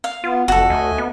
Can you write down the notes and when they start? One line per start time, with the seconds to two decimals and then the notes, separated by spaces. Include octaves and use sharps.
0.04 F5
0.24 B3 F4
0.48 F#1 F2 F#4 A4
0.70 D2 A3 D#5 G#5
0.98 B3